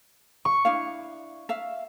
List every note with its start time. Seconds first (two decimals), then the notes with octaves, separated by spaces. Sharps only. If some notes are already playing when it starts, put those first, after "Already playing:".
0.45 C#6
0.65 D4 E4 F5
1.49 E5 F5